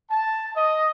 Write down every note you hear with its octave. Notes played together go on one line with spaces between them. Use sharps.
A5
D#5